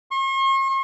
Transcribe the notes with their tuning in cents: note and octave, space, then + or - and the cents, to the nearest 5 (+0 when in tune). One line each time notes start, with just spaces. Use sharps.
C#6 -45